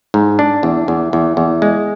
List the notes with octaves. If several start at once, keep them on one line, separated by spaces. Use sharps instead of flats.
G#2
D4
E2
E2
E2
E2
G#3